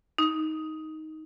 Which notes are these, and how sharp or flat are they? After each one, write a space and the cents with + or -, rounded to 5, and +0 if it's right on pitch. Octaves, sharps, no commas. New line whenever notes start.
D#4 +10